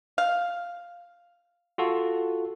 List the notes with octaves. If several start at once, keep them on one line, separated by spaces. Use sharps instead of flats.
F5
F4 F#4 A4